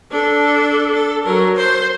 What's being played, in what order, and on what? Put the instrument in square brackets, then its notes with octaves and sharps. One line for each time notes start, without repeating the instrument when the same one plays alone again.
[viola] D4 A4
A4
F#3 A#4
C5